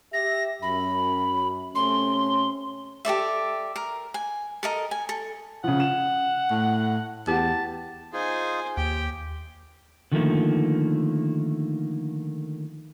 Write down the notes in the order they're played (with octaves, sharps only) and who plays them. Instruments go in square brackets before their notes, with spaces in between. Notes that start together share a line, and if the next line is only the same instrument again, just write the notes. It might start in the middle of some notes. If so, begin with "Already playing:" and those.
[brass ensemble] G4 E5 [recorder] A#6
[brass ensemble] F#2 [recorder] B5
[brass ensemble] C3 A3 C#4 [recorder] C6
[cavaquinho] G4 A4 D5 E5
A#4
G#5
A4 A#4 D#5
G#5
A4
[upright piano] C#3 F3 [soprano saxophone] F#5
[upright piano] E7
[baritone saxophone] A2
[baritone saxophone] E2 [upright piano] G4 F#5 [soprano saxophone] A5
[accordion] D#4 F4 G#4 [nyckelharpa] C5 G#5
[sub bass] D#2 [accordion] G4 [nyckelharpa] G5
[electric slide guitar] D3 D#3 F3 A3 A#3